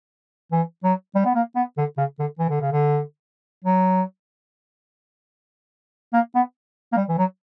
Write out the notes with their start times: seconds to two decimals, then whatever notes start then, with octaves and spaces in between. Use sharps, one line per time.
0.52 E3
0.84 F#3
1.15 G3
1.25 B3
1.35 A#3
1.56 B3
1.78 D3
1.97 C#3
2.19 D3
2.39 E3
2.50 D3
2.61 C#3
2.72 D3
3.64 F#3
6.13 A#3
6.35 B3
6.92 A#3
6.97 G3
7.09 E3
7.18 F#3